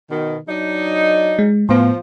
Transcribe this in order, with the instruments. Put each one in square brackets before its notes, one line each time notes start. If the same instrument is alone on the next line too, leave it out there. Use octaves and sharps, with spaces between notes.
[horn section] B2 D#3
F#3 D4 D#4
[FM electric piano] G#3
[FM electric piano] A2 B3 [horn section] F3